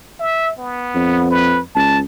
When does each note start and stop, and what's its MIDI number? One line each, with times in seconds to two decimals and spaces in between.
0.20 0.52 76
0.58 1.29 59
0.95 1.60 41
1.30 1.59 71
1.75 2.02 37
1.75 1.98 81